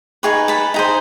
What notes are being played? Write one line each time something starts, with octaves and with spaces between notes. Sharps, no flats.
D#4 G#4 B4 C#6
A5 B5
D#4 G#4 C5